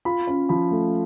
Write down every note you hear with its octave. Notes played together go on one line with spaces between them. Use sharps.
F4 B5
C#4
F3 B5
A3